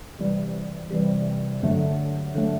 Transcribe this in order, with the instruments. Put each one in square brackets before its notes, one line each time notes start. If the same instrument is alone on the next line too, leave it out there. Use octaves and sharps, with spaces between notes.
[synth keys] C3 E3 G3
C3 E3 G3
G2 D3 F#3 A3
G2 D3 F#3 A3